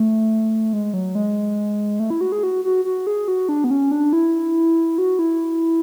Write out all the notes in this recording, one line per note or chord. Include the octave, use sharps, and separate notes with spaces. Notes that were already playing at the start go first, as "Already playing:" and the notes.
Already playing: A3
G#3
F#3
G#3
A3
E4
F#4
G#4
F#4
F#4
F#4
G#4
F#4
D4
B3
C#4
D4
E4
F#4
E4